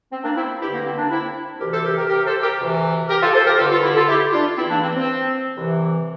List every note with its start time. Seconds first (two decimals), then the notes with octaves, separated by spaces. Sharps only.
0.11 C4
0.23 A#3 D4
0.35 C4 E4
0.60 G2 D3 E4 G4
0.73 A#3
0.85 C4
0.98 A#3 D4
1.10 C4 E4
1.59 D2 C3 E3 G4 A#4
1.72 A4 C5
1.85 G4 A#4
1.97 G4 A#4
2.09 G4 A#4
2.26 A4 C5
2.42 G4 A#4
2.59 D2 C3 E3
3.09 G4 A#4
3.21 F4 A4
3.33 A4 C5
3.45 G4 A#4
3.58 G2 D3 F4 A4
3.71 F4 A4
3.83 E4 G4
3.95 F4 A4
4.08 E4 G4
4.32 D4 F4
4.57 E2 E3 C4 E4
4.69 A#3 D4
4.82 C4
4.95 C4
5.57 C2 C3 E3